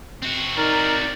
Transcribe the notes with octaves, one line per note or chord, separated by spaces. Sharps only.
C4 F#4
D#4 A#4 D5